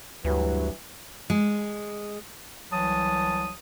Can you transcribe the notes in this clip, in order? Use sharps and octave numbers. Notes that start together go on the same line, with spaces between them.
D2 G2 E3 F#3 G4
G#3
C2 E3 F#3 A5 D#6